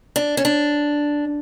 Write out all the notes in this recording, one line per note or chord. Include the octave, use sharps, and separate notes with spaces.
D4
C#4
D4